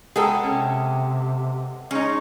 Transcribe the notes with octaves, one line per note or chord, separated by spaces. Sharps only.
G#3 B3 G#4 A4 G5 A#5
C3 C#4
G#3 C#4 D#4 C#5